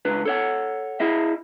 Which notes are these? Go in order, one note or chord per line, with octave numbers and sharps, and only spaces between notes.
C#2 D4 B4
A4 C#5 F#5
E4 G#4 D#5 E5